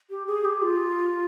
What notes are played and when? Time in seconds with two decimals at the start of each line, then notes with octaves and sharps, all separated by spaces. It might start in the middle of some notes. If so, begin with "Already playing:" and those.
0.10 G4
0.27 G#4
0.45 G4
0.62 F4